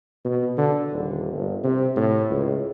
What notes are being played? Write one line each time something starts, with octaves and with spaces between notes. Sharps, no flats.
B2
D3
D#1
G1
C3
A2
C#2